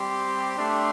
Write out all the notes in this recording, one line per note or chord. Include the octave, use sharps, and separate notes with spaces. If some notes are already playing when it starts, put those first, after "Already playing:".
Already playing: G3 C4 G4 C6
A3 D4 G4